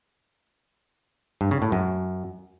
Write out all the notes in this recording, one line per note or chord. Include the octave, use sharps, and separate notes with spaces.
G2
C#3
A2
F#2